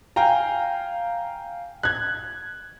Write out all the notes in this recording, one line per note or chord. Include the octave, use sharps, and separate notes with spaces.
F5 G5 G#5 A#5
F#6 G#6